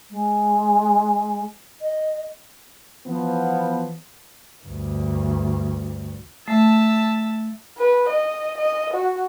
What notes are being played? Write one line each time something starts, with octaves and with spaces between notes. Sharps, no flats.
G#3
D#5
E3 F3 B3
D2 G2
A3 E5 A5
B4
D#5
D#5
F#4